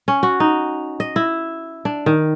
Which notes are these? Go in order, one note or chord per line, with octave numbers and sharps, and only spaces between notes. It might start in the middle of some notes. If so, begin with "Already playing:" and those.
C#4
F#4
D#4
D#5
E4
D4
D#3